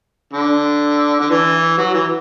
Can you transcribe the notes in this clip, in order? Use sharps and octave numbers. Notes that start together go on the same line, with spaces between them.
D3
D3
E3
F#3
E3